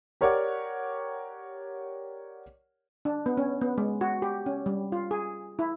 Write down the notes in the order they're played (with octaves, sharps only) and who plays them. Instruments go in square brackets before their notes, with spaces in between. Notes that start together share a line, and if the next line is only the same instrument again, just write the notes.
[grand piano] G4 A#4 C#5 D5 F#5 D6
[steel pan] D4
B3
C#4
B3
G#3
F#4
G4
C#4
G3
F4
G#4
E4